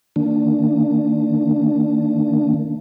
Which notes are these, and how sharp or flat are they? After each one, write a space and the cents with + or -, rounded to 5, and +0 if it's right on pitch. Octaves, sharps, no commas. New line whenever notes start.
D#3 +0 A#3 -35 D4 +0